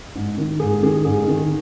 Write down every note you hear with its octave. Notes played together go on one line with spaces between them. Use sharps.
G#2
D#3
G#2 G#4
D#3 G#4
G#2 G#4
D#3